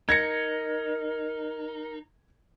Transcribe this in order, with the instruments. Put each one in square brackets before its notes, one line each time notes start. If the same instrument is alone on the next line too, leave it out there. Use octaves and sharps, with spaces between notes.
[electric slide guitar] D#4 [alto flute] A#4 [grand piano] G#6 A#6 C#7